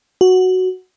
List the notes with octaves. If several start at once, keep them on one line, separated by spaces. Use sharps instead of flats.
F#4